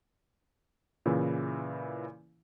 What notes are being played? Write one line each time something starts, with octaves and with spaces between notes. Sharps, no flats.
A#2 C#3 E3 E4